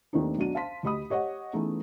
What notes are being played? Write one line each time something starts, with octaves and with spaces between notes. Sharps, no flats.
D#2 D#3 A3 C4 D4 D#4
B1 F#3 D4 D#7
C5 F5 A5 C6 B6
D2 G4 D#5 B5 D#6
G4 C#5 D#5 F#5
E3 A3 B3 C#4 D#4 G#4